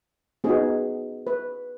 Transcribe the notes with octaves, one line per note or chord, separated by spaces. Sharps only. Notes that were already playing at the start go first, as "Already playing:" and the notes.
B3 D#4 F#4 G#4
B4